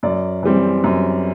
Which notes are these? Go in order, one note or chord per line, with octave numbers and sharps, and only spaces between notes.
F#2 D5
E3 G3 C4
F#2